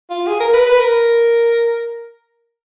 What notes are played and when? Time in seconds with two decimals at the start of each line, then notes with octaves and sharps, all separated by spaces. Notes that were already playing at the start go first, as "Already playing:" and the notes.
0.10 F4
0.27 G#4
0.40 A#4
0.53 B4
0.66 B4
0.80 A#4